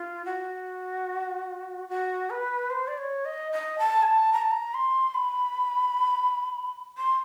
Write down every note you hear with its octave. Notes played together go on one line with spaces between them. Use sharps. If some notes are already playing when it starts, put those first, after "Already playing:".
Already playing: F4
F#4
F#4
B4
C5
D5
C#5
D#5
D#5
A5
G#5
A5
A#5
A5
A#5
C6
B5
C6